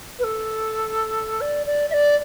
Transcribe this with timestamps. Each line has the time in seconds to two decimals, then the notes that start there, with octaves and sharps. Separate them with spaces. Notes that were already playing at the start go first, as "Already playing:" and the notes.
0.19 B4
0.23 A4
1.41 D5
1.66 D5
1.90 E5
1.93 D5